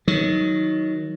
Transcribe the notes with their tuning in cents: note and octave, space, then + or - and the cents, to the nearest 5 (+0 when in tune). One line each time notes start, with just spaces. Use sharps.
D#3 +15 F#3 +0